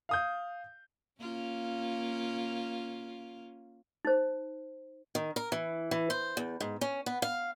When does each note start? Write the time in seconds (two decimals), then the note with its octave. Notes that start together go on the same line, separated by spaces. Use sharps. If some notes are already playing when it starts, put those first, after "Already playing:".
0.09 F5 D#6 G6
1.20 A#3 C#4 F4
4.05 D#4 C5
5.15 D#3
5.36 A#4
5.52 E3
5.91 E3
6.10 C5
6.37 E2
6.61 G#2
6.81 C#4
7.06 B3
7.22 F5